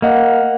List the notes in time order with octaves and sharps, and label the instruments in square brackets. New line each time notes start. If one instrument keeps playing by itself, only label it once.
[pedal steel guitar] A#3 [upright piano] D#5 F#5